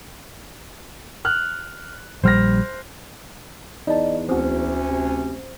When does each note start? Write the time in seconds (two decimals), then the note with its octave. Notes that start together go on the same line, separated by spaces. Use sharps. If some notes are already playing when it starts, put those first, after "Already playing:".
1.25 F6 F#6
2.24 A#1 G3 C5 F6 A#6
3.87 E2 D#4 D5 D#5 A5
4.29 D2 C4 C#4 F#4 C5
4.89 C3